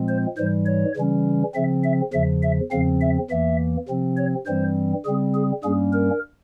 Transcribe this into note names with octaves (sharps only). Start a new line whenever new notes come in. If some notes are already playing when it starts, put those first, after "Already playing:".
Already playing: A#2 F3 G#3 C4
C5
G#2 E3 G3 C5
C#5
C#3 E3 G3 C#4
C#3 F3 C4 E5
E5
E2 C#3 F3 E5
E5
E2 C#3 F3 C4 F5
E5
E2 E3 A#3 E5
C3 F3 C4
C#5
G2 E3 G3 C4 C5
C#3 G3 C4 G#4
G#4
G2 G3 A#3 C#4 G#4
A#4